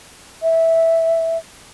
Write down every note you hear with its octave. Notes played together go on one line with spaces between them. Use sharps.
E5